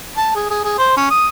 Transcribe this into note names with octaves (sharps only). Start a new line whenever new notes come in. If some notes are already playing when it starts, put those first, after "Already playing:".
A5
G#4
G#4
G#4
C5
C#4
D#6